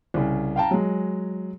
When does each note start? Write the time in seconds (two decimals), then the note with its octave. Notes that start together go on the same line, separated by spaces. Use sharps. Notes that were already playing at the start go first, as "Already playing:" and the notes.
0.14 C2 C#3
0.56 F5 G5 A5 A#5
0.71 F#3 G#3